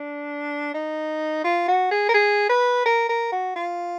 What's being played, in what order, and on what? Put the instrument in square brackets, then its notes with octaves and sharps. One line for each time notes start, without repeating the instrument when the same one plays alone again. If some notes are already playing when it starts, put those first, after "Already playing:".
Already playing: [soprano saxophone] D4
D#4
F4
F#4
G#4
A#4
G#4
B4
A#4
A#4
F#4
F4